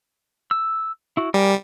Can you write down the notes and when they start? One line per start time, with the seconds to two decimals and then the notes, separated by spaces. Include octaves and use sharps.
0.51 E6
1.17 E4 F#4
1.34 G3 A#4 D5 G#5